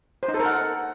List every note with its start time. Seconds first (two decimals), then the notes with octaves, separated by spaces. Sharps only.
0.23 C5
0.28 D#4
0.34 A4
0.40 A#4
0.46 F#5